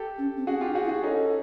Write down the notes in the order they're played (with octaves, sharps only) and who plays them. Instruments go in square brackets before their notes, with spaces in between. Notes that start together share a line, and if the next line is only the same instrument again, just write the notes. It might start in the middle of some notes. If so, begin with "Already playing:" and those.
Already playing: [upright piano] G4 A4
[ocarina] C#4
C4
[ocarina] C#4 [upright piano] F#4 G#4
[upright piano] F4 G4
[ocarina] D4
[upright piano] F#4 G#4
[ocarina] E4
[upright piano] F#4 G#4
[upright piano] C#4 D#4 [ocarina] A4